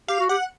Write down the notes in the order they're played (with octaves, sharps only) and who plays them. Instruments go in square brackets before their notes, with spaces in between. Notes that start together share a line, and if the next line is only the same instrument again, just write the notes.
[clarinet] G4 [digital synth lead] F5
[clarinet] F#4
[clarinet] G4 [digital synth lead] F#5